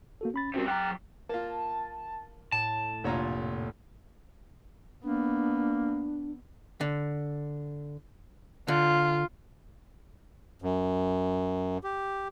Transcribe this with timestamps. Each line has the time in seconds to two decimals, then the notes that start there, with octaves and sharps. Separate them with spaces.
0.21 A#3 F#4 A4
0.34 C#4 B5 A6
0.54 C3 G3 C#4 F#4 A#4
0.68 F#3 G5 A#5 D6 F#6
1.29 A#3 F4 A5
2.52 A2 A5
3.04 F1 A#2 D3 F4 C#5 A#5
5.03 A#3 B3 D4
6.81 D3
8.68 D3 F4
10.62 F#2
11.84 G4